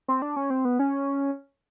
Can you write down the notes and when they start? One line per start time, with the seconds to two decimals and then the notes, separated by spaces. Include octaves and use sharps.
0.08 C4
0.22 D4
0.36 C#4
0.50 C4
0.65 B3
0.79 C#4